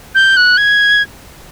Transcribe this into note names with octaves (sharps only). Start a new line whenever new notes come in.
G6
F#6
G#6